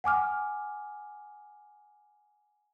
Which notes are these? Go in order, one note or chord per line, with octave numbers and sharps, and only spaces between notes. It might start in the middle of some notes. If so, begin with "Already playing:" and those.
F#5 G#5 D6 F6